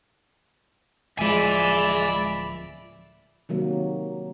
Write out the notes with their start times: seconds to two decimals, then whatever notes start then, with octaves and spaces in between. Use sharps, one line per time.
1.19 D1 F3 G#3 D5 E5 G#5 B5
3.49 C3 D#3 F#3 A#3